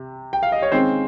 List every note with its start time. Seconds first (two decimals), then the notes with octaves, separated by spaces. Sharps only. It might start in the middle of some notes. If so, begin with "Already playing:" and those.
Already playing: C3
0.33 G5
0.43 F5
0.52 D#5
0.62 C#5
0.72 D#3 G#3 C4 C#4 C5